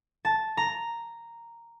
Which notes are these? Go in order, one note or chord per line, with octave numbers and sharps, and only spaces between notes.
A5
A#5